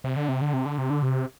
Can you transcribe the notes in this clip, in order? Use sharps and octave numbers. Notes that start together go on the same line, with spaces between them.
C3
D3
C3
D3
C3
D3
C3
D3
C3